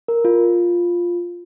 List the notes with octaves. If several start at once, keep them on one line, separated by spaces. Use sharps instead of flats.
A#4
F4